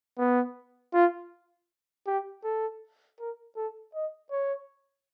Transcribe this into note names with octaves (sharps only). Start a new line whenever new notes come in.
B3
F4
G4
A4
A#4
A4
D#5
C#5